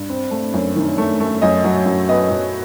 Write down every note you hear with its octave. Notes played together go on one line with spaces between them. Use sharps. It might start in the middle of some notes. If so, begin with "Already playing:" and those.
Already playing: G2
C4
A3
F#2
D#3
A3
A3
F#2 D#5
F#3
F#2
B3 D#5
F#2